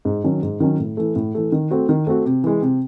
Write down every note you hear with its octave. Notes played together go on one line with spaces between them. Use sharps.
G#2
D#3 F#3 C#4
G#2
D#3 F#3 C#4
A2
E3 A3
A2
E3 A3
D#3
A3 C4 F#4
D#3
A3 C4 F#4
C3
E3 G#3
C3